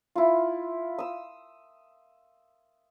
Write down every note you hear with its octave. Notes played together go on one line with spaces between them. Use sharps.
E4 F4
D#6 E6